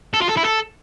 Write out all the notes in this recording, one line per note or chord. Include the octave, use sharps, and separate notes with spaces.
A4
F4
A4
E4
A4